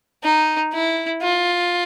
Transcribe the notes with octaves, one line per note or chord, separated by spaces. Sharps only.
D#4
E4
F4